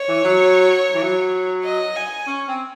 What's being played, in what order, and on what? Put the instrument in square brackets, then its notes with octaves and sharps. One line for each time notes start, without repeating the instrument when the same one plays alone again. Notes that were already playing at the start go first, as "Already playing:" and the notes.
Already playing: [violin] C#5
[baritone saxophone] E3
F#3
E3
F#3
[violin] D#5
G#5
[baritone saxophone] C#4
C4